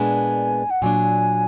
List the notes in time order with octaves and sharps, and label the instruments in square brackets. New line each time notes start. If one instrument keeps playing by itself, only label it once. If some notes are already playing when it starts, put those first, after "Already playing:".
Already playing: [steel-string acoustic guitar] A#2 G#3 B3 D4 [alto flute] G#5
[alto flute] F#5
[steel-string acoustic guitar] A#2 F#3 D4 [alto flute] G#5